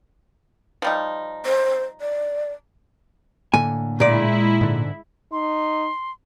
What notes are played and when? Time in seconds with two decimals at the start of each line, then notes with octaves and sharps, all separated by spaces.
0.82 F3 G3 D#4
1.46 C5
2.01 D5
3.54 A2 D3 A#3 G#5
4.00 A#2 G#3 E4 D5
4.61 G#2 D3
5.32 D#4 C6